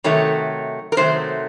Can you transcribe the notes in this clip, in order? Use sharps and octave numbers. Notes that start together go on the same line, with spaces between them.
C3 D#3 F#3 A3 C#5
A#4
C3 D#3 F#3 A3 C5